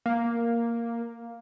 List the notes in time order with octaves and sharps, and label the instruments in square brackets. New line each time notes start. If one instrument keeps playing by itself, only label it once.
[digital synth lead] A#3